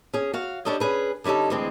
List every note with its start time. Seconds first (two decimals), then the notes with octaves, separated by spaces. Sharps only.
0.14 C#4 G#4
0.34 F#4 F5
0.65 G3 C#4 D4 A4 C#5 D#5
0.80 C#4 G#4 B4
1.24 D3 G3 C#4 D#4 A4
1.50 D2 E3 G#3 C4 G#4